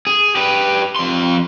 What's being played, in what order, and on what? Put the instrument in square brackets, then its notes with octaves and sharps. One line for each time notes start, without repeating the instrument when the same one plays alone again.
[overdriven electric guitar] G#4
G4 B4
F2 C6